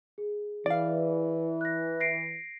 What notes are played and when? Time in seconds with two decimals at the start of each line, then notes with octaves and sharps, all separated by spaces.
0.18 G#4
0.66 E3 D5 F5
1.61 F#6 A#6
2.00 A#6 C7 D7